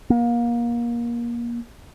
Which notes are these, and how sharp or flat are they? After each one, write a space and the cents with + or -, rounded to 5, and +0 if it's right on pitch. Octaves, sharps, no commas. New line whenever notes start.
A#3 +25